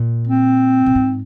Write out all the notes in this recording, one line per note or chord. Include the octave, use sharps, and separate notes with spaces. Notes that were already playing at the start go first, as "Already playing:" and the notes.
Already playing: A#2
C4
A#2
G#2